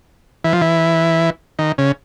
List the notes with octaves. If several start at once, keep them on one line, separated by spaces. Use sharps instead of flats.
E3
F3
E3
D#3
C#3